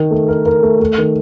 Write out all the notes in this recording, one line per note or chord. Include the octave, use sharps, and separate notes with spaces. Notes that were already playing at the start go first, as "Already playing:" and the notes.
Already playing: D#3 A#4
A3
A#4
A#4
A3
A3
D#3